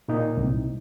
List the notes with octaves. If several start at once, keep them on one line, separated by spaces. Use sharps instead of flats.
A#2 A#3 D#4
C2